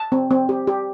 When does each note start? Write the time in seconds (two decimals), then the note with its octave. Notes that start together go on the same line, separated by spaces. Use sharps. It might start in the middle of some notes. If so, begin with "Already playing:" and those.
Already playing: A5
0.12 C4
0.31 C4
0.49 G4
0.67 G4